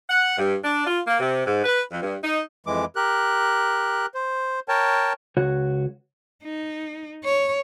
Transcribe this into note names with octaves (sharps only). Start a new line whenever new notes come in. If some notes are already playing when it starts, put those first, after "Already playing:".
F#5
G2
D4
F4
A#3
C3
G#2
B4
F2
G2
D#4
F2 E3 G#3 D6
G4 A#4 F#6
C5
A#4 C#5 G5 A5
C#2 F#4 C#5
D#4
C#5